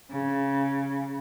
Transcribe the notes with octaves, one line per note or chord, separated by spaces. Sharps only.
C#3